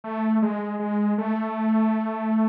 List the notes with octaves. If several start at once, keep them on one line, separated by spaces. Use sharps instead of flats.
A3
G#3
G#3
A3